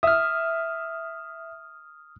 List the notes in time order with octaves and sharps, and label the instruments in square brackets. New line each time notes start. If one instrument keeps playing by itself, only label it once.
[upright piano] E5 [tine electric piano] D#6 F6